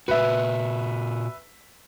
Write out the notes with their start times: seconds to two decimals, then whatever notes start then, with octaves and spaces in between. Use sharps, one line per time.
0.08 A#2 F#4 B4 E5